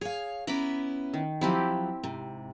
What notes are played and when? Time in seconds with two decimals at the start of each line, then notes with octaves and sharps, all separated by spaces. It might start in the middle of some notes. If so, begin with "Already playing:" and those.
0.01 G#4 C#5 F5
0.47 B3 C#4 E4 A#5 B5 D6
1.14 D#3
1.41 F3 F#3 C4 E4 G4
2.04 G#2 C3